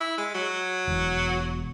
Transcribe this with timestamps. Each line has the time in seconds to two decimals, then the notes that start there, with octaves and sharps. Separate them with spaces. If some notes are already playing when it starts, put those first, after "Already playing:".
0.01 E4
0.18 G#3
0.34 F#3
0.87 E1